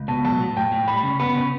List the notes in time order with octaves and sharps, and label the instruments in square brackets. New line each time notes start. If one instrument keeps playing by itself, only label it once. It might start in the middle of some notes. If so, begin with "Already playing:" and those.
Already playing: [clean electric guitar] C#2
[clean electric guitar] B2 [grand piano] A5
[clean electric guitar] F#3 [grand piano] A5
[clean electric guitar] A2
[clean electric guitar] A2 [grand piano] G5
[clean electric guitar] A2
[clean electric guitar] G3 [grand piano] B5
[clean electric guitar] C#3
[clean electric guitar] B3 [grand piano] B5
[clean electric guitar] C#3